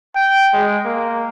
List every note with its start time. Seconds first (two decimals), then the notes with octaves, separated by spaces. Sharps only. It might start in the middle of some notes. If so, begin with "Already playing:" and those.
0.15 G5
0.53 G#3
0.85 A#3